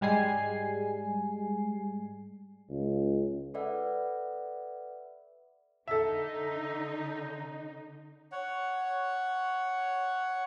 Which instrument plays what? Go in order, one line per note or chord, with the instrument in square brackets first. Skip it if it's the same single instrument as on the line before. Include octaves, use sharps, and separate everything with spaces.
[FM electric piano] G#2 G3 G#3 G#5 C7
[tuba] C#2
[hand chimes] A4 B4 D5 E5 F#5
[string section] D3 D#4 [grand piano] A4 E5
[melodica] C#5 F#5